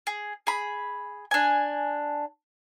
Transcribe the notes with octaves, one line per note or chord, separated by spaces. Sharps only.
G#4
G#4 B5
D4 G#5